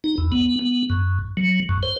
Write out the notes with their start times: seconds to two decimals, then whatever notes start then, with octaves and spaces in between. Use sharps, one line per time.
0.04 D#4
0.18 E2
0.32 B3
0.59 B3
0.90 F#2
1.37 F#3
1.69 F#2
1.83 C5